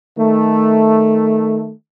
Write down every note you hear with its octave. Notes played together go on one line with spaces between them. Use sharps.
D#3 A3